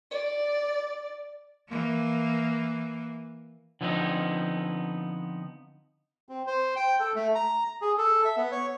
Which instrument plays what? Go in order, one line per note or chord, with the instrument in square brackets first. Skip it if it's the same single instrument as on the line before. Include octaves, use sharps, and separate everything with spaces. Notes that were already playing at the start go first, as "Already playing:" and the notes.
[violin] D5
[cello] E3 A#3
[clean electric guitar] D3 F3 G3 B3 C4 D#4
[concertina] C4
C5
G5
A4
A3
A#5
G#4
A4
E5
B3
C#5